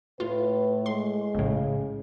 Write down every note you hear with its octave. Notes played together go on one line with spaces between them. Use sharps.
A2 F4 B4
G#3 C6
A#1 A2 C#3